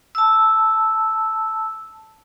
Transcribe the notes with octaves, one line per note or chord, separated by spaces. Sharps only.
A5 E6